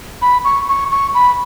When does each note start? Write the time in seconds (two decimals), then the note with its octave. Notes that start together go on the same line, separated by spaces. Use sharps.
0.22 B5
0.44 C#6
0.68 C#6
0.91 C#6
1.15 B5